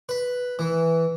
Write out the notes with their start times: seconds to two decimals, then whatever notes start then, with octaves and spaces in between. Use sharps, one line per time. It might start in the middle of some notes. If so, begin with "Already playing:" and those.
0.09 B4
0.59 E3